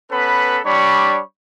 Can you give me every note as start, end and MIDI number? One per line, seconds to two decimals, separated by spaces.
0.11 0.60 59
0.11 0.60 61
0.11 0.60 69
0.11 0.60 71
0.11 0.60 83
0.65 1.22 55
0.65 1.22 62
0.65 1.22 73
0.65 1.22 83
0.65 1.22 85